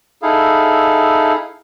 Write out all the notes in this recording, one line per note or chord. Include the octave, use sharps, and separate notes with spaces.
D#4 E4 G#4 A4 F5